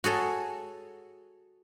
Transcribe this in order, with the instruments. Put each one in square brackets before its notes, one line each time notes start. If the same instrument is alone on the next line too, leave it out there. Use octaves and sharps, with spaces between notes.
[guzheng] F#4 G#4 A4 C#5